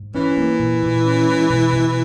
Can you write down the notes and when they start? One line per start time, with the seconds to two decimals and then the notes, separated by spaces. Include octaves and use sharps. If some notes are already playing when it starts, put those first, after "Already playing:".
Already playing: G#2
0.15 E3 C#4
0.37 A#3
0.59 A#2
0.83 A#2
1.05 C#4
1.28 G#3
1.50 B2
1.72 B2